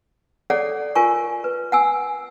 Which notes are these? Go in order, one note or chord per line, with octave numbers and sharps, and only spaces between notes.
G#4 A4 C#5 D5 F#5
F4 A#4 G#5 C#6
B4
F#5 G#5 E6